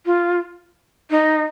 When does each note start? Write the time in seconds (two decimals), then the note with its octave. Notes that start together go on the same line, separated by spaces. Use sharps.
0.06 F4
1.11 D#4